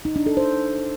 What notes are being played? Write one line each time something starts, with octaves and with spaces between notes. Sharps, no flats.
D#4
D4
A4
C5